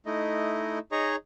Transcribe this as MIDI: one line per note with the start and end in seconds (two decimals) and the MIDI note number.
0.06 0.79 57
0.06 0.79 63
0.06 0.79 64
0.06 0.79 75
0.92 1.16 63
0.92 1.16 68
0.92 1.16 73
0.92 1.16 75
0.92 1.16 82
0.92 1.16 85